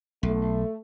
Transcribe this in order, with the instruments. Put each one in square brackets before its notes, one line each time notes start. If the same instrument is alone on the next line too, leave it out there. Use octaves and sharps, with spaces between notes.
[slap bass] B1 [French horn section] A3